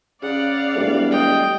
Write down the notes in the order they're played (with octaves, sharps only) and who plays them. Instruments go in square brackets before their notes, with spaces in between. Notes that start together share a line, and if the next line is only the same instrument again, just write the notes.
[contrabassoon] C#3 [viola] D5 F5 [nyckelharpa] F#5
[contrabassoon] E1 [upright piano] G3 A3
[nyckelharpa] D#5 G5